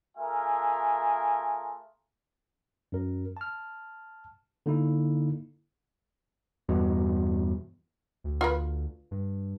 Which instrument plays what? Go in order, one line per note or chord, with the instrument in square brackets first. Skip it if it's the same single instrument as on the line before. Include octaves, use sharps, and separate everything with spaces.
[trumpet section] A3 F4 G#4 A#4 E5 G#5
[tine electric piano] F#2 A#4
A5 F6
D3 A#3 D#4 E4
[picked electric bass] E2 G2 B2
[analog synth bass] D2
[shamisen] F4 A#4 B4
[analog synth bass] G2